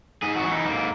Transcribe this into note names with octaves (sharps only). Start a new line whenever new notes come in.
G#2 G#4
F#4
E3
D#4
G#2 A#3